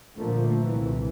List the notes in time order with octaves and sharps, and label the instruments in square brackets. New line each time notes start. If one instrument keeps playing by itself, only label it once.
[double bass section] A#2 D3 F3 A3 A#3
C2 E3